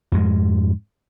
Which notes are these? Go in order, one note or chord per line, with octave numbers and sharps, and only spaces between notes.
F2 G#2 G#3